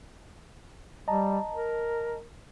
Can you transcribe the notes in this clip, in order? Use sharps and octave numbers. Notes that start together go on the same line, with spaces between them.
G3 D#5 A5 A#5
A#4